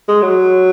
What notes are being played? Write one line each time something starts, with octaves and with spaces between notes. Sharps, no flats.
G#3
F#3